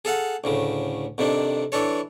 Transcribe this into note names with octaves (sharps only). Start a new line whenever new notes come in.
G#4 A4 F5 F#5
D2 A2 C#3
F2 C3 D#3 D4
E3 D4 A4 C#5